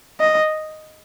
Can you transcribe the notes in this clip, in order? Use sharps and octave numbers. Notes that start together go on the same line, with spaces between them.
D#5